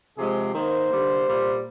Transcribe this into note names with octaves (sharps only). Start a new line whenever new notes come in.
C3 F3 G#3 C4 G#4
D#3 A#3 C5
D3 G3 A#3
A#2 G3 A#3